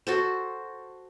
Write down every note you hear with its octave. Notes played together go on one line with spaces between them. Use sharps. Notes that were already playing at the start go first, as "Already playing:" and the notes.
F#4 A4 C5